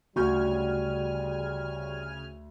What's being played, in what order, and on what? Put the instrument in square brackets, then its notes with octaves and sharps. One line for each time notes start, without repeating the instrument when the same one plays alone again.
[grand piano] D2 C#6 G6 [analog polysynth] C#3 G#5 F6 [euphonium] G3 [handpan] F#4